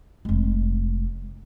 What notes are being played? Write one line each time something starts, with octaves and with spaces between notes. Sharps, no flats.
F1 G#3